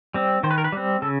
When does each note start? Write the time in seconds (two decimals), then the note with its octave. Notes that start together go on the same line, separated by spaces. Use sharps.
0.14 G3 C4
0.43 D#3 C5
0.51 B4
0.58 A#4
0.64 B4
0.72 G3 C4
1.02 C#3 A4